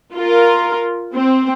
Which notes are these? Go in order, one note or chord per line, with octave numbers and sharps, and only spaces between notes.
F4 A#4
C4